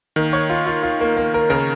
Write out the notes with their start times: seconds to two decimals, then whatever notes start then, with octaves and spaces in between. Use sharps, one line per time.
0.16 D#3 A#3
0.33 C#5
0.50 F4
0.66 F4
0.83 F4
1.01 A#3
1.17 A#3
1.34 A#4
1.50 C#3 A#4